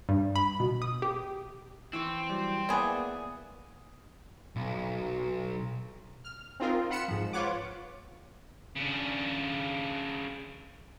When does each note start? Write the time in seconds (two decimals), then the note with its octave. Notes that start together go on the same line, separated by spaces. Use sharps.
0.09 G2
0.36 B5
0.60 B2
0.82 D#6
1.02 G4
1.93 E3 C4 E4 C#6 E6
2.30 F#3 G3
2.69 A#3 B3 E4 G#4 D5 F#5
4.56 B1
6.24 F6
6.60 C4 D#4 F4 A#4
6.90 F4 F#5 B5 C#7 E7
7.08 G#2 F3
7.33 F4 B4 C#5 F#5 D6
8.76 C#3 D4